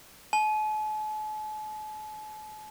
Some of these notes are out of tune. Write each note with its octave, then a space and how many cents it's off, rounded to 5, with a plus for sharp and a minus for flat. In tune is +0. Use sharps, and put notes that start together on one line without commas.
A5 -45